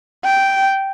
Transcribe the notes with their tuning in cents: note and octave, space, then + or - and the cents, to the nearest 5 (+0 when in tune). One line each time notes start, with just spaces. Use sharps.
G5 -10